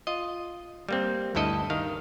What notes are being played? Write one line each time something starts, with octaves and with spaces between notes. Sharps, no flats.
F4 D#5
G3 A#3 C4
D2 G2 E4 A4 D#5
D#3 F5